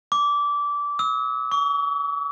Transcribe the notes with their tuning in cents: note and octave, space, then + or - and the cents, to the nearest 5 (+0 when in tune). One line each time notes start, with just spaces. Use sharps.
D6 -20
E6 -40
C#6 +45